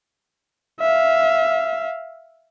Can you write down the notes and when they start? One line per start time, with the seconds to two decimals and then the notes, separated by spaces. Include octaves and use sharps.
0.80 E5 F5